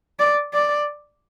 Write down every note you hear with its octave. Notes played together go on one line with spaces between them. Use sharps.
D5
D5